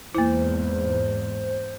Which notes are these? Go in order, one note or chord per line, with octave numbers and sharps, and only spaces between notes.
E2 G#2 A#3 E4 C5